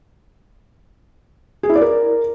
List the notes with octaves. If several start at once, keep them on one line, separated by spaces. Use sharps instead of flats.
G#4
E4
D5
A#4